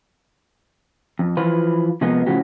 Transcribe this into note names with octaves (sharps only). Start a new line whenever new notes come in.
F2
E3 F3 F4 B4
C3 F3 G#3 A#3 B3
A2 C#3 F3 F#3 F#4 G4